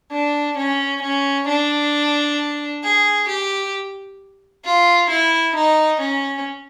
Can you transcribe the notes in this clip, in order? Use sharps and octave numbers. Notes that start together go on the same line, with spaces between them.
D4
C#4
C#4
D4
G#4
G4
F4
E4
D#4
C#4